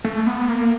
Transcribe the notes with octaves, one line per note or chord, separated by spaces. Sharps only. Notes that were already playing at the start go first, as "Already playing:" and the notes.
A3
B3
A#3